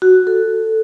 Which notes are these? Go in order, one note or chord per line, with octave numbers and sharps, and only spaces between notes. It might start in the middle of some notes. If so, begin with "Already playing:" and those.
F#4
A4